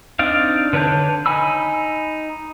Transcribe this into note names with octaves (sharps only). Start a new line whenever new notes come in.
C4 D4 D#4 D5 F5
D3 B4 C#5 A5 G6
D#4 G#5 B5 E6